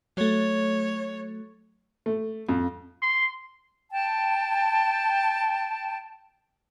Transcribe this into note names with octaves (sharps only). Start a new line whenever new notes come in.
F#3 A3 C#5
A3
F2
C6
G5 A5